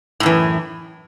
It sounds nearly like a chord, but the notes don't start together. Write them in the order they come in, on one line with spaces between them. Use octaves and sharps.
A2 F#2 E3